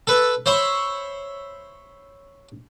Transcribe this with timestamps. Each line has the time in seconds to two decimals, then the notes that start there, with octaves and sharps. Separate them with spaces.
0.07 A4 B4
0.46 C5 C#5 E5 B5 C#6